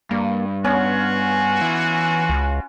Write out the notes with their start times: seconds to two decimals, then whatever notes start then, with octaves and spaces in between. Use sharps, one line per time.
0.11 G2 A#3
0.64 B3 C#4 F4 F#4
1.61 E3
2.29 C#2